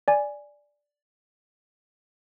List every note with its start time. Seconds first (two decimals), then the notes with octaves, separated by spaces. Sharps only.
0.08 D5 G#5